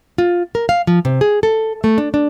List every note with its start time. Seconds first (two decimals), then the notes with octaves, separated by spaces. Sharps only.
0.18 F4
0.55 A#4
0.69 F5
0.87 F3
1.05 C3
1.21 G#4
1.43 A4
1.84 A3
1.98 D4
2.14 D4